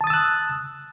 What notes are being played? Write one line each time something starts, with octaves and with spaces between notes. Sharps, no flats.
A5 D#6 E6 F#6 A6